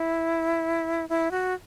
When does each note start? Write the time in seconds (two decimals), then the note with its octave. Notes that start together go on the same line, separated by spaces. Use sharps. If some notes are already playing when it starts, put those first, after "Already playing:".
Already playing: E4
1.09 E4
1.31 F#4